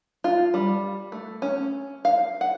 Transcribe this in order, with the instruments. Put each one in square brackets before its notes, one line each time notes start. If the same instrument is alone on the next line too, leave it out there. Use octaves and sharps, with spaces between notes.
[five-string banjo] F4
G3
A3
C#4
F5
F#5